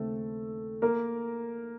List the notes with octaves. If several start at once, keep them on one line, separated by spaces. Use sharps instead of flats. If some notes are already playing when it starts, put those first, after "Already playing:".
Already playing: D#2 C#3 A3 C4 A4
A#3 A#4